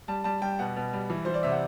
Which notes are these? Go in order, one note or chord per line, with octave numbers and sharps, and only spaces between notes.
G3 A5
G3 A5
G3 G5
B2 F#5
B2
G3
E3
E3 C5
D5
C3 E5
F#5